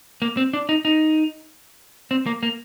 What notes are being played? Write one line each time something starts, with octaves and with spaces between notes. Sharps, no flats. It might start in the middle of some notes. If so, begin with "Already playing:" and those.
A#3
C4
D4
D#4
D#4
C4
A#3
A#3